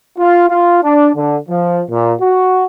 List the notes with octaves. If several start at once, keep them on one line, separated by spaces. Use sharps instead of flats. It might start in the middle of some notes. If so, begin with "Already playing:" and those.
F4
F4
D4
D3
F3
A#2
F#4